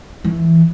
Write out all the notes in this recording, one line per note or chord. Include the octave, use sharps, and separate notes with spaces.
E3